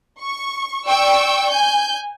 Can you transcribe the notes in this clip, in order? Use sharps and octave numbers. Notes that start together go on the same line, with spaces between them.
C#6
D5 G5 C#6 E6
G#5 G6